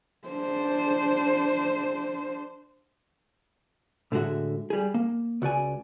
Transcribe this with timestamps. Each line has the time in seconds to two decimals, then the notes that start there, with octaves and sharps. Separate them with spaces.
0.28 D4 C5
4.12 A2 D3 G#3 F#4 E5
4.70 G3 G#4
4.94 A#3
5.42 C#2 F#4 D5 G#5